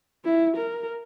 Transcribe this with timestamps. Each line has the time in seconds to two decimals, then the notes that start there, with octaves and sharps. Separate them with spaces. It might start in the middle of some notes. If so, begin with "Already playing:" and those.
0.25 E4
0.57 A#4